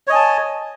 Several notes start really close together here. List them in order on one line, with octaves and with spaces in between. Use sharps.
C#5 D#5 G#5 A5